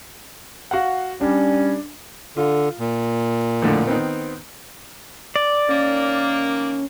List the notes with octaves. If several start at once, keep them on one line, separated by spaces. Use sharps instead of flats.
F#4 F5 F#5
G3 C#4 D4
D3 F4
A#2
F2 A2 D3
D#3 B3 C4
D5
D#3 A#3 C#4